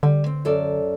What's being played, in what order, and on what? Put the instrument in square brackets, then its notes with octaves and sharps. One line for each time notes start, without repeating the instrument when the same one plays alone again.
[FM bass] D3 [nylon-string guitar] G3
[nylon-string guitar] C4
F#2 A4 D5